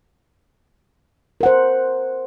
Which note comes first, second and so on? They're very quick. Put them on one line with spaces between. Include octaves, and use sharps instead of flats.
A#4 F#5 C5